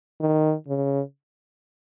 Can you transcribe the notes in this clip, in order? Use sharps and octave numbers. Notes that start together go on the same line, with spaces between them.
D#3
C#3